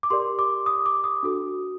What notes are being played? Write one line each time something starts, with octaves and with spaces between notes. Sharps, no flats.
D6
G4 A#4 D5 C6
D6
D#6
D6
D#6
D4 F#4 A4